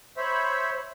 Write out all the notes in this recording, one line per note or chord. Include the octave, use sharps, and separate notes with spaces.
C5 C#5 E5 B5